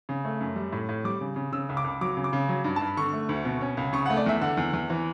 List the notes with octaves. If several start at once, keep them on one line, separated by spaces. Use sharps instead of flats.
C#3
A3
F#2
G3
A2
A2
G3 D6
C#3
C#3
C#3 E6
C#2
D6
C#2
F#3 D6
C#3
D6
C#3
F#3
G2
G2 A5
B5
D3 C#6
A3
D2
B2
C#4
C#2
C#3 C#6
F#5
A3
D5
E2 E5
D3 F#5
E2
E2
E3